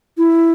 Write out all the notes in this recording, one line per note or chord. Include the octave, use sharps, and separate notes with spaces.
E4